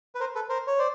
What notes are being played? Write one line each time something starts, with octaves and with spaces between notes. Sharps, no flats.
B4
A#4 C5
A4 B4
A#4 C5
C#5
C5 D5